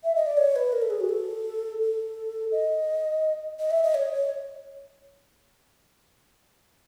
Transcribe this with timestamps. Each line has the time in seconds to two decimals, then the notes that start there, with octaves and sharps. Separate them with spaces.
0.04 E5
0.16 D#5
0.26 D5
0.37 C#5
0.56 B4
0.73 A#4
0.82 A4
0.90 G#4
1.00 F#4
1.09 A4
1.80 A4
2.52 D#5
3.59 D#5
3.71 E5
3.83 D#5
3.95 C#5
4.13 C#5